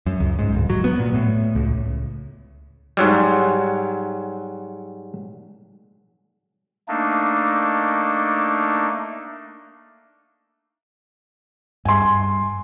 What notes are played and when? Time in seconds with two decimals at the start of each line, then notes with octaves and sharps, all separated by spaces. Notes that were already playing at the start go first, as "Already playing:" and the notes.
0.06 F#2
0.20 C#2
0.39 G#2
0.55 D1
0.70 F#3
0.84 B3
1.00 A#2
1.14 A2
1.55 C#2
2.97 G#2 F#3 G3
6.88 A3 A#3 D4 D#4
11.85 G2 G#5 C6